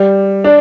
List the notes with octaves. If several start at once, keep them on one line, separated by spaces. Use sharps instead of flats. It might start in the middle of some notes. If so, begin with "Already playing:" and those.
Already playing: G3
D4